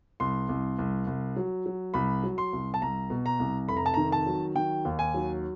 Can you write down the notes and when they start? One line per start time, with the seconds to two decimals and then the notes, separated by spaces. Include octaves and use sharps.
0.20 C2 C6
0.49 C2
0.79 C2
1.07 C2
1.36 F#3
1.66 F#3
1.94 C2 B5
2.23 F#3
2.38 C6
2.53 C2
2.74 A5
2.82 C2 A#5
3.10 B2
3.26 A#5
3.40 C2
3.69 F1 B5
3.77 A#5
3.86 A5
3.94 D#3 A#5
4.12 A5
4.26 F#3
4.55 D#3 G5
4.85 D#2
4.99 G#5
5.14 F#3